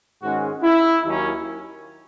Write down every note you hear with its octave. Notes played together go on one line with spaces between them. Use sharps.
G#2 D#3 G#3 C#4 F#4
E4
D#2 D#3 F#3 A#3 C#4